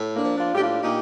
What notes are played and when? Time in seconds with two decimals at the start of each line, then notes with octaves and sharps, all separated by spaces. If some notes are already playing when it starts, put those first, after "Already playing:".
Already playing: A2
0.15 A#3 D4
0.23 F3
0.37 D4 F4
0.52 A2 G4
0.59 D4 F4
0.81 A#2 D#4 G4